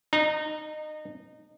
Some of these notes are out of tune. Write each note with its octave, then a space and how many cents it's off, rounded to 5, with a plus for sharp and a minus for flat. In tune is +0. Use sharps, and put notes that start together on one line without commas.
D#4 -25 A#5 +0